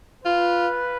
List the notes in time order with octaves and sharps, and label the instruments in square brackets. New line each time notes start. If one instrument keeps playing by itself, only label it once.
[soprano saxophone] F4 [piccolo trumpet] B4